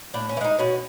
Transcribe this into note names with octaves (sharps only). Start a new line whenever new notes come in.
A2 D4
C#4
E3
G#3 D#4
B2 C#4